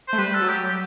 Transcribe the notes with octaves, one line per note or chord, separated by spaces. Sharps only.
A3 C5
G3 B4
A4
F#3
G4
G4